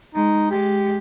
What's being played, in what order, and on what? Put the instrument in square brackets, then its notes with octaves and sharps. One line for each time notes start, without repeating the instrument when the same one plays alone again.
[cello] G#3 [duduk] D#4
[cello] G#3 [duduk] G4